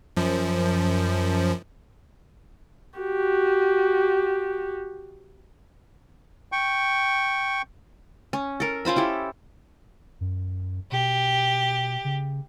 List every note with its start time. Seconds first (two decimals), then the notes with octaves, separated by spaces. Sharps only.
0.16 F#2 F3
2.99 F#4 G4
6.52 G5 C#6
8.33 C#4
8.60 A4 A#4
8.85 C#4 F4 C5 B5
8.96 E4 G4 A4
10.21 F#2
10.92 B2 G4
12.05 C#3